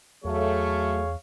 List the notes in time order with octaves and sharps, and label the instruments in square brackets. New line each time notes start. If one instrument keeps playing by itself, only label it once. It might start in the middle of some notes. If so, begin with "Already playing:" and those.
[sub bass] E2 [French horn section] F#3 A3 [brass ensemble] G#4 C#5 F5